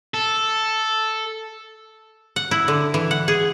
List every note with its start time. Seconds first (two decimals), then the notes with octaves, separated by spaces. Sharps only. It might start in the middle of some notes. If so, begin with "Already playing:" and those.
0.14 A4
2.36 F#5
2.51 E4
2.68 D3
2.94 E3
3.11 F#5
3.28 G#4